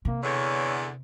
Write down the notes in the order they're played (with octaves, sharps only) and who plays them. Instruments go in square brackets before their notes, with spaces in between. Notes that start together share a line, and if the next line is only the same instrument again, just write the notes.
[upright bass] C3 [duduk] A#3
[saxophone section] E2 D3 [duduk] C#5